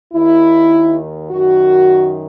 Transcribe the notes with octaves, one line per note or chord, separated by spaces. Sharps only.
D#2 D#3 E4
F#2 D#3 F#4